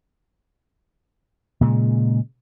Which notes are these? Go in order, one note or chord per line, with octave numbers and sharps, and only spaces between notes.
A#2 C#3 G#3